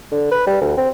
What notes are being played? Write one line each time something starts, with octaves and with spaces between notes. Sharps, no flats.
D3
B4
G3
D2
C4